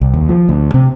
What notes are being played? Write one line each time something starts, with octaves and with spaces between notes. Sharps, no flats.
C2
D#2
F3
D2
C3